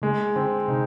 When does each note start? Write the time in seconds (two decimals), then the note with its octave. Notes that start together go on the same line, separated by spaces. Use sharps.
0.02 C#3 G#3
0.36 D3 C4
0.68 C3 D#4